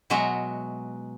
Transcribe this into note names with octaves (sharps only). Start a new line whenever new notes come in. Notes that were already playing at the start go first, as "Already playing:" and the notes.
B2 F#3 G#3 F#4 E5 A#5